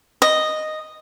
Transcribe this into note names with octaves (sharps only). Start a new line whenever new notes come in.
D#5